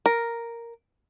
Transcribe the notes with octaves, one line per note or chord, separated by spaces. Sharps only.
A#4